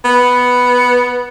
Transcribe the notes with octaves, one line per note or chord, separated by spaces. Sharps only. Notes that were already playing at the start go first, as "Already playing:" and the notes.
B3